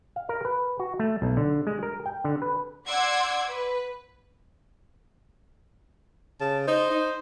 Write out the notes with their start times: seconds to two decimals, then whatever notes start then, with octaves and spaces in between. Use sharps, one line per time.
0.16 F5
0.29 A#4
0.45 B4
0.79 F#4
0.99 A3
1.22 B1
1.37 D3
1.67 G#3
1.83 A#4
2.06 G5
2.24 D3
2.42 B4
2.86 D5 F#5 C6 D6 E6 G#6
3.48 B4
6.40 C#3 A5
6.67 D#4 C5
6.90 D#4